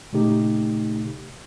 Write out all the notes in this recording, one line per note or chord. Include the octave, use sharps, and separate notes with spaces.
A#2 C#3 A3 D#4 G4